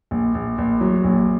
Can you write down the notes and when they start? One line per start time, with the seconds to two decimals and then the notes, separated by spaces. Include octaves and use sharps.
0.11 A#1
0.35 A#1
0.58 A#1
0.81 F#3
1.04 A#1